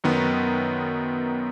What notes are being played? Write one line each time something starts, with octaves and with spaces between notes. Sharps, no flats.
F#2 D#3 B3